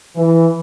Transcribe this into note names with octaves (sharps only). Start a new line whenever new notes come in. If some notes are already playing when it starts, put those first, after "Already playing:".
E3